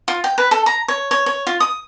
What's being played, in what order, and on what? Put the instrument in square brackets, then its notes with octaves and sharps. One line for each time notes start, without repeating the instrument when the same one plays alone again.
[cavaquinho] F4
G5
B4
A4
A#5
C#5
C#5
C#5
F4
D#6